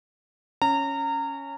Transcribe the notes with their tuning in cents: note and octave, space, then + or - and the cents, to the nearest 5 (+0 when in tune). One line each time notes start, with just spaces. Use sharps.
C#4 +0 A#5 -25